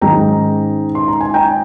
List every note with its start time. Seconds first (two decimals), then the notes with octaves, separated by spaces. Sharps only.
0.01 G#2 D#3 G#3 C#4 G5 A#5
0.95 C6
1.08 A#5
1.21 G#5
1.34 G5 A#5